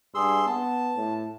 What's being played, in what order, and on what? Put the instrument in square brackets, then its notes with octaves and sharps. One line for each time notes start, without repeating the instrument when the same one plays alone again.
[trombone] G2 [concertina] G#4 C6 E6
[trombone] B3 [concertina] A5
[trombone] A2